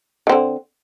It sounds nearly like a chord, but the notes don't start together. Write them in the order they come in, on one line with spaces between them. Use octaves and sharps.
D#3 C4 D3